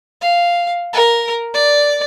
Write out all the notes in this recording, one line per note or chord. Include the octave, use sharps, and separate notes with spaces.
F5
A#4
D5